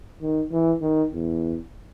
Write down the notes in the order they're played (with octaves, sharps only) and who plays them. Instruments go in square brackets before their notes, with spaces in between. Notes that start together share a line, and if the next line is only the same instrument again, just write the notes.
[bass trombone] D#3
E3
D#3
E2